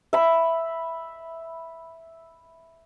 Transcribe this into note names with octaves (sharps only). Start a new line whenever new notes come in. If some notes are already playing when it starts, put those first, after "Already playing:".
E5 B5